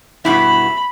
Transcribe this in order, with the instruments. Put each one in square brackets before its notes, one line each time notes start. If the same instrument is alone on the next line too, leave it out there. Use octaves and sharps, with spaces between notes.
[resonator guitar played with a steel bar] G2 B2 E4 [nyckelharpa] B5